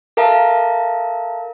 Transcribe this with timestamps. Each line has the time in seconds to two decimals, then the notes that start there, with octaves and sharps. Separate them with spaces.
0.17 A4 A#4 E5 F5 A5 A#5